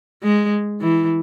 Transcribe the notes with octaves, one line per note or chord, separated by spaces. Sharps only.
G#3
E3